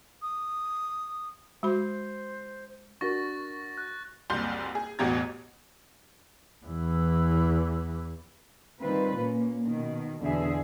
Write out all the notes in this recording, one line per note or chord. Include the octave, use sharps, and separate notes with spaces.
D#6
G#3 F#4 C5 B5
D4 F#4 A#4 C#6 A6 A#6
F#6
F#1 C2 C6 G6
G#4
A1 E2 B2 G4 A#5 G#6
E2 E3
D#3 G3 C4 F4 B4
A#2 A#3 C#4
B2 D#3
E2 B2 D3 B3 G#4 E5